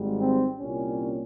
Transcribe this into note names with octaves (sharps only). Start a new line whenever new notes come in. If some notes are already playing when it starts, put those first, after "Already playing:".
Already playing: G#1 G#2 G3
C4
C2 A#2 G3 C#4